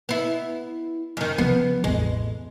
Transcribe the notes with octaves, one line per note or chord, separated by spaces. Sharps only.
B3 E4
F#2 D#3
C#3 F3 B3
A1 E2 G#3